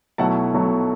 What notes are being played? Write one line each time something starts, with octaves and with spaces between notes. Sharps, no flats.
B1 B2 F#3 A3 E4 F#5 A5
B1 B2 F#3 A3 E4